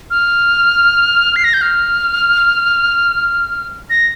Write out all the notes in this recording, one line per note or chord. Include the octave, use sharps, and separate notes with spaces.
F6
C7
A#6
G6
F6
A#6